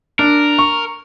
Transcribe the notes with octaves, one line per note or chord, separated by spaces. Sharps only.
D4 A#4
C#6